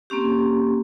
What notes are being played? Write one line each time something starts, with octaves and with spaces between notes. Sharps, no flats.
A#3 C4 C#4 G4